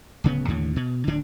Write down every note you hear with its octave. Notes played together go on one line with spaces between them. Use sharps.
D1 C#3 B3
D#2 A2 D3
B2
D1 D3 D4